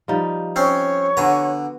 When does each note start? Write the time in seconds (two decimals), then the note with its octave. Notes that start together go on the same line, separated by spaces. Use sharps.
0.08 F3 G3 D#4
0.56 C4 C#4 C#5 C6
1.17 D3 B3 F#4 G#5 A#5